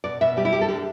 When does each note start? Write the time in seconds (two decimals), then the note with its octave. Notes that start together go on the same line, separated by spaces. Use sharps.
0.04 B2 D5
0.21 B2 E5
0.37 G3 G4
0.45 E4
0.53 G3 G4
0.61 A4
0.69 D3 G4